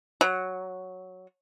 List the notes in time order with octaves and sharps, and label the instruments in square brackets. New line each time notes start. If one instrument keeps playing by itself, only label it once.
[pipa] F#3